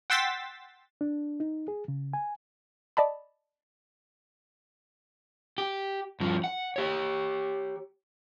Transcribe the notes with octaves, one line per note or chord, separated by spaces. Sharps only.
F#5 G5 C6 E6 A6 B6
D4
D#4
G#4
C#3
G#5
D5 D#5 A5 B5
G4
G2 F3
F#5
G4 C#5